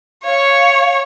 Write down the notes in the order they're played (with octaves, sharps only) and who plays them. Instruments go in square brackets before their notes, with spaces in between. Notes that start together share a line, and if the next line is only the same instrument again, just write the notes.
[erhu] C#5 [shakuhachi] F5